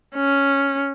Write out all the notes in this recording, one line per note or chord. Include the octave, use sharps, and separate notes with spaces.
C#4